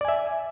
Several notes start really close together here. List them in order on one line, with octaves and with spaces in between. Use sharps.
D5 G#5 E5